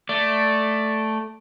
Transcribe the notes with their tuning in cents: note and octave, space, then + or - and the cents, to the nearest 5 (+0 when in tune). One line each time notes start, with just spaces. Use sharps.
A3 +0 D5 +0